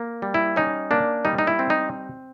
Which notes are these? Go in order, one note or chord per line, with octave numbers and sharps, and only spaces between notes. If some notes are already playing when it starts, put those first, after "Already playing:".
Already playing: A#3
G3
E4
C#4 D#4
A#3 D4
G3 D#4
D#4
E4
C4
D#4